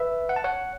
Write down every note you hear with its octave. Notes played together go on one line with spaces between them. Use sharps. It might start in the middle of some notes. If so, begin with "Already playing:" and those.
Already playing: B4 E5
F#5
A5
C#5 F#5